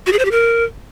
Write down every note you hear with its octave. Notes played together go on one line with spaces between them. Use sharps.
F#4
G#4
C5
G4
A#4